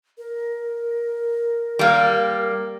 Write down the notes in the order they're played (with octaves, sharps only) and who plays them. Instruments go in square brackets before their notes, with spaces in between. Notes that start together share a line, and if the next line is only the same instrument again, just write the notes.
[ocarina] A#4
[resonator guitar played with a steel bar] G3 A#3